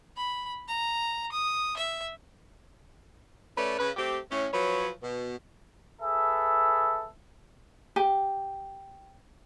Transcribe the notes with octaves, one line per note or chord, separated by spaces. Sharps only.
B5
A#5
D#6
E5
A3 C#4 B4 D5
C#3 B4
A3 C4 G4
A2 C#4
F3 F#3 B4 C#5
B2
G#4 A4 B4 E5
G4